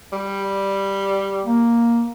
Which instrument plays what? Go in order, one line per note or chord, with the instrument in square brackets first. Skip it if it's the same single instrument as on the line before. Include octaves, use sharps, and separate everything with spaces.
[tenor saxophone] G3
[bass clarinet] A#3